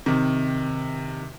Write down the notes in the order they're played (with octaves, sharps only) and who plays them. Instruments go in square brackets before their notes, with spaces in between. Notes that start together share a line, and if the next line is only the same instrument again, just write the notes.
[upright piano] C3 D#3